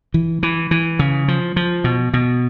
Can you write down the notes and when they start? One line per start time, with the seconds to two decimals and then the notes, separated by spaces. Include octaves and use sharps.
0.14 E3
0.43 E3
0.71 E3
0.99 C#3
1.28 F3
1.56 F3
1.84 B2
2.13 B2